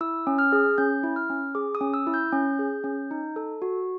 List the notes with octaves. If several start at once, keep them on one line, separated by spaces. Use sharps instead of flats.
E4 E6
C#4
F6
G#4
C#4 G6
E4
F6
C#4
G#4 D6
D#6
C#4
E6
E4
G6
C#4
G#4
C#4
D#4
A4
F#4